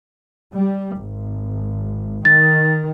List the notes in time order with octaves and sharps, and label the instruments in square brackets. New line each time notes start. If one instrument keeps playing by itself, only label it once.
[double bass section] G3
G#1
[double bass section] D#3 [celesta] A6